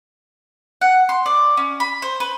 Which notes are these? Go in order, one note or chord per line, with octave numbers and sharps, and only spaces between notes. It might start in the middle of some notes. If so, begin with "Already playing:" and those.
F#5
C6
D5
C#4
B5
C5
B4